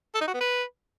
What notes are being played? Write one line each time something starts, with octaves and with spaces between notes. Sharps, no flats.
A4
D#4
F#4
B3
B4